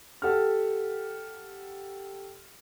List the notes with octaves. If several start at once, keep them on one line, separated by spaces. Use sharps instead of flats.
G4 A4 F#5 F6